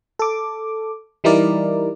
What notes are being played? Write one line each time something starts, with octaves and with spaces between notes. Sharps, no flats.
A4 D6
E3 G3 D#4 E4 A#4 D5